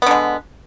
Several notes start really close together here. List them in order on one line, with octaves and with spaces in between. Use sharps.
B3 D3 G#3